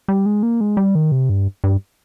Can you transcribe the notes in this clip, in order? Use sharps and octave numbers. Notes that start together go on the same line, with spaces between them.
G3
G#3
A#3
G#3
G3
D#3
C3
G2
G2